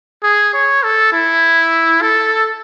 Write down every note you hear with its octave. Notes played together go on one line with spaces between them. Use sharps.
G#4
C#5
A4
E4
A4